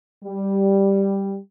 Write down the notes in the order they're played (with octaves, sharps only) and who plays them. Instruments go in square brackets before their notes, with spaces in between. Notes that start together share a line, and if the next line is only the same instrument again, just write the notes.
[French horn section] G3